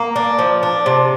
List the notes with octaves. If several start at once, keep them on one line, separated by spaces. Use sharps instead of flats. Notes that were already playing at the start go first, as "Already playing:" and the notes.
Already playing: A#3
D4
F3
D4
C3